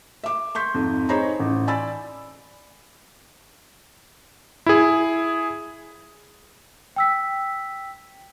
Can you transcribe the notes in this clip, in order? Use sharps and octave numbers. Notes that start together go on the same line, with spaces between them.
E5 D6
C6 C#6 G6 B6
F2 G#2
D#4 G#4 C5 C#5 A#5 B5
A1
D5 G#5 B5 E6 A6
E4 G#4
G5 E6 B6